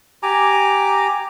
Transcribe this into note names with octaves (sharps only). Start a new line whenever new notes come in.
G4 G#5 A#5 D6